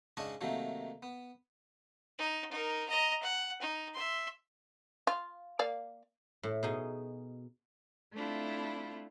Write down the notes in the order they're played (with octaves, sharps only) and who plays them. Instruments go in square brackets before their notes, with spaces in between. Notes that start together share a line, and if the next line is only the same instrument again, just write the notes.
[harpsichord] G#2 C#3 D4 D#5 A5 C#6
C3 D#3 F#3 A3 A#3
B3
[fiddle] D#4
D#4 A#4
D#5 A#5
F#5
D#4
E5 C6
[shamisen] F4
A#3 D5 F5
[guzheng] A2
B2 D#4 G#4
[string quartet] A3 C4 D4 E4 F4